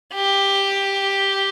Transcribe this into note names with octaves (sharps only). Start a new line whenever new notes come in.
G4